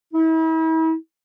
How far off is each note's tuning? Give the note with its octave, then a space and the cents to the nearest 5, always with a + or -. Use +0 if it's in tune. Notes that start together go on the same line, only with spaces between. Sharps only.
E4 -40